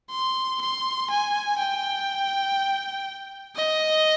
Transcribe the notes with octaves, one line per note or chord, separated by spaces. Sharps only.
C6
C6
G#5
G5
D#5